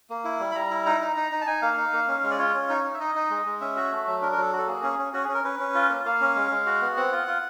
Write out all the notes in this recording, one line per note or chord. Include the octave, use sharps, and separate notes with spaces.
A#3
E4
G3
B5
G3 A#5
E4
D#4 A#5
D#4
D#4
D#4
A5
D#4 G#5
A#3 F5
D#4
A#3
C#4
G#3
D5
F4 C#5
C#4
D#4
D#4
E5
D#4 D#5
D#4
G#3
G#3
C#4 E5
F#4
A3
F#3
D4 A#4
A#4
F#3 A4
F#4
A4
A#3 G#4
C#4
C#4
C#4 F#4
G#4
C#4
A#4
C#4 B4
C#4
F4
A#3
A#3 F5
C#4
G#3
G#3
F#4
B3
C4 F#5
F4
F4